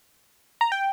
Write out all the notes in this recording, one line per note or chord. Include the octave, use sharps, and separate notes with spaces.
A#5
G5